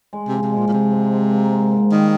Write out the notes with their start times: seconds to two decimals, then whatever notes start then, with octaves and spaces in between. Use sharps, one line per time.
0.13 G#3
0.28 C3 F3
0.43 C3
0.52 G#3
0.58 A#2
0.68 A#2
0.72 C3 F3
0.92 G#2
1.12 G#3
1.32 A#3
1.52 G#2
1.72 G#2
1.91 D#3 G3